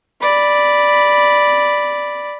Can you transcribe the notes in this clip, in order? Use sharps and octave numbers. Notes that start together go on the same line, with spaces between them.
D5 B5